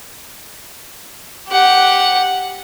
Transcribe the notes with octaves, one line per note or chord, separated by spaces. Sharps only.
G4 F#5